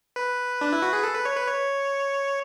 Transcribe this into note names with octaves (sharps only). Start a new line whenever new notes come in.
B4
D4
E4
F#4
G#4
A4
B4
C#5
B4
C#5